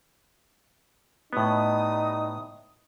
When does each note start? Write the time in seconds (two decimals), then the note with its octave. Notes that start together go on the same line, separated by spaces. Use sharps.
1.33 A2 G3 A3 B3 D#4 D#6